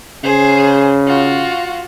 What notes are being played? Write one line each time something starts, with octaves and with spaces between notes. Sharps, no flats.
C#3 G#4 C5
F4 F#4